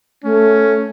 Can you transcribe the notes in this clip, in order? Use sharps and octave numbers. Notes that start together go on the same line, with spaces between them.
A3 C#4